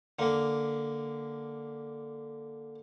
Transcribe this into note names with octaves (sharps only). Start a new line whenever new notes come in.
D3 A#3